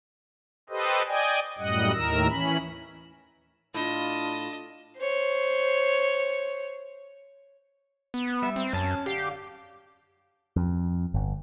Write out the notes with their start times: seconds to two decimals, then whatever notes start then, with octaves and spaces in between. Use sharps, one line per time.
0.70 G4 A4 B4 C5 D#5
1.07 D5 D#5 G5 G#5
1.59 F#2 A2 G3 D#5 F#5
1.93 D#2 A2 D#3 A#4 E6 A#6
2.29 E3 C#4 B5
3.74 A2 D4 F4 D#5 A5
4.98 C5 C#5
8.14 B3
8.42 G3 E5
8.56 C4
8.73 F#2 C#4 A5
9.06 D3 G4 F5
10.56 F2
11.14 G1